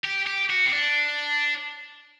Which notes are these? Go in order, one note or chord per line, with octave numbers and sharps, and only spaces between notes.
G4
G4
F#4
C4
D4